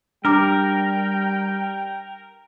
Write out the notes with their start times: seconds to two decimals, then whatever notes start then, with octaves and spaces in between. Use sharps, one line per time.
0.25 G3 D4 A#4 G5 A#5 D6